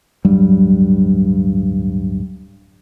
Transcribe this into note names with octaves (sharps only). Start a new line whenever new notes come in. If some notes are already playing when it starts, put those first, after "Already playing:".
D1 G2 F#3 G3